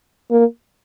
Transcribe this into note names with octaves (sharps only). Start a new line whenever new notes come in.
A#3